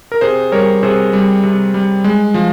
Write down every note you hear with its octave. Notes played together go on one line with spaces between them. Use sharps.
A#4
C3 G#4 C5
G3 A#4 C#5
C3 G#4 C5
G3
C3
G3
G#3
F3